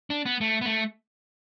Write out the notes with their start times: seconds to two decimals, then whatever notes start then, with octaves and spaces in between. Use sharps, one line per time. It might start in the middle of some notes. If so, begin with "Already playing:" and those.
0.10 D4
0.26 B3
0.41 A3
0.61 B3
0.66 A3